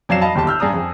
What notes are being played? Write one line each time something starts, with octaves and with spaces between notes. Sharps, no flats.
F2 F#3 D5 F5 C7 E7
D#5 F5 A5 B5
G1 D#2 G4 A5
E6 F6 G6
G2 G#4 D5 A#5 D#6
F2 G#4